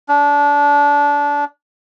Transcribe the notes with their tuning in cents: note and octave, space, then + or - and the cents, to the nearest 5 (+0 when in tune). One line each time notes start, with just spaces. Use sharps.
D4 -25